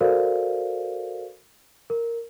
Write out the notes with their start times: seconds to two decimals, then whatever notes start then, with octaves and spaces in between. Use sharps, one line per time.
0.01 F#4 A4 A#4 C5 D5 F5
1.90 A#4